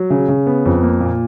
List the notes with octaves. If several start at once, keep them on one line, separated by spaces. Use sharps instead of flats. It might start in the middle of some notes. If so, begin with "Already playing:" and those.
Already playing: F#3
C#3
C#3
B3
F2
A#3
A#2